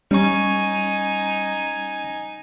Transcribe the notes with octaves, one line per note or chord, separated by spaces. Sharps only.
G3 C#4 D#4 G#5 C#6